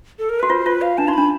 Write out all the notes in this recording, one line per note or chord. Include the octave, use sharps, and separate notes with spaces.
A4
A#4
F#4 B4
F4 C5
F4 B4
F5
D4 A5
D#4 C6
D4 B5